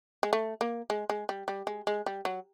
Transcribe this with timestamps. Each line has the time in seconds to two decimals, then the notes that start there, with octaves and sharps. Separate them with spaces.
0.23 G#3
0.33 A3
0.61 A#3
0.90 G#3
1.10 G#3
1.29 G3
1.48 G3
1.67 G#3
1.87 G#3
2.06 G3
2.25 F#3